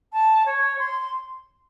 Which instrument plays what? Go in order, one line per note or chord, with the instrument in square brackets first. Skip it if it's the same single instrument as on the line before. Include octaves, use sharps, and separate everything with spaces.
[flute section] A5
C#5
C6